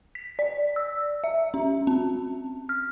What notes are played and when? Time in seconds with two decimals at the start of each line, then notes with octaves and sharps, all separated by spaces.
0.15 B6
0.39 D5
0.76 E6
1.24 E5
1.54 C#4
1.87 C4
2.69 F6